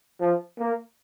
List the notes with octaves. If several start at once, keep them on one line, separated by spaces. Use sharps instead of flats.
F3
A#3